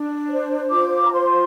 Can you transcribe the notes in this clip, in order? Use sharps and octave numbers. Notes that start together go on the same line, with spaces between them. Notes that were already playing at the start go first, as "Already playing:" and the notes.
Already playing: D4
C5
F4 D6
A#5
C5 C6